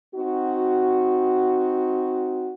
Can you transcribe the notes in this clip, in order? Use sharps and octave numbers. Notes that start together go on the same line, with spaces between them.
C4 D#4 F#4